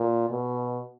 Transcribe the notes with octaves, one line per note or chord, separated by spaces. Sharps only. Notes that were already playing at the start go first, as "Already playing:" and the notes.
Already playing: A#2
B2